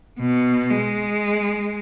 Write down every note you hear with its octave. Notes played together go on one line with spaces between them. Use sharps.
B2
G#3